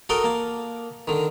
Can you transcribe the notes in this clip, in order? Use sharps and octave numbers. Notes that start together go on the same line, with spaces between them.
F#4 A4 A#4 D#5 G5
A#3 A5
D3 D#3